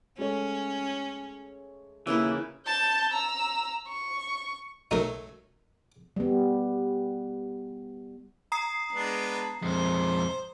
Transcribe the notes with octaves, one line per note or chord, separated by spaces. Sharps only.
G#3 A3 C#4 C#5
D#2 C#3 E3 A#3 E4 B4
A5 G6
A#5 E6
C#6
B1 F#3 A3 D#4 A#4
G3 B3
A#5 D#6 C7
G#3 B3 D4
F2 G#3 C5